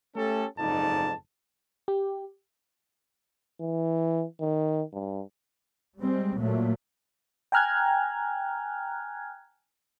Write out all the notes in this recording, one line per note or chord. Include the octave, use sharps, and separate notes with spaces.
A3 C#4 G4 A4
F#1 F2 G#2 D#4 D5 A5
G4
E3
D#3
G2
G3 G#3 C4
A#2 F#3 A3
G5 G#5 A#5 F6 F#6 G#6